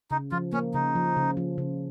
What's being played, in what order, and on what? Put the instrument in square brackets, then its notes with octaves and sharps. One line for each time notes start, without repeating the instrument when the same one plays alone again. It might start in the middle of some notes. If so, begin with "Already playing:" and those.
[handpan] C#3 [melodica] D#4
[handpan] F3 [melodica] F4
[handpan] A#3 [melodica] C#4
[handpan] C#3 [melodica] D#4
[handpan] F3
C#3
F3
C#3